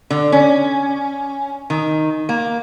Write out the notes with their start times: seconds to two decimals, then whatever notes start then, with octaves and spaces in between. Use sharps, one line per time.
0.10 D3
0.32 C#4
1.70 D#3
2.29 A#3